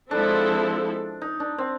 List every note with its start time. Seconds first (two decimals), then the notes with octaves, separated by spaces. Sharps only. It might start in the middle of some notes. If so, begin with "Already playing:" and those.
0.11 F3 G#3 C4 D4 E4 A4
1.22 D#4
1.40 D4
1.58 C4